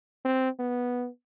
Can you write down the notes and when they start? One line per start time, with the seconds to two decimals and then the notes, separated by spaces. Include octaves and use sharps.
0.25 C4
0.59 B3